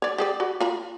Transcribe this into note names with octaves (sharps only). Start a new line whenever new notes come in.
C#5 D5
G4 G#4 D5
F#4 B5
F4 A#5 B5